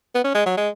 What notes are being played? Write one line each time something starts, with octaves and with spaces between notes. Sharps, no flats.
B3
C#4
G#3
F#3
G#3